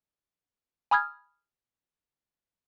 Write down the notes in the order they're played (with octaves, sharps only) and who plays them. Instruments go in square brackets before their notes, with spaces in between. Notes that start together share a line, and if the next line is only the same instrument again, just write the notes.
[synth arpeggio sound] G#5 B5 D#6 F6 G#6